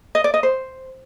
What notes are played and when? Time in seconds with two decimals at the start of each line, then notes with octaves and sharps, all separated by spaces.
0.15 D#5
0.24 D5
0.34 D#5
0.43 C5